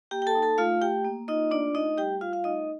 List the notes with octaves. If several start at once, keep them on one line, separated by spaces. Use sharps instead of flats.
A#3 G4 G5
G5
A4 A5
D#4
A4 A5
A3 F4 F5
A3 G4 G5
A#3
D#4 F4 D#5
A3 D4 D5
A3 D#4 D#5
G3 G4 G5
G3 F4 F5
F4 F5
A3 D#4 D#5